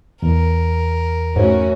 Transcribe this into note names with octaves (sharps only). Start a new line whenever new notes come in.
E2 A#4
G#2 A3 C#4 F#4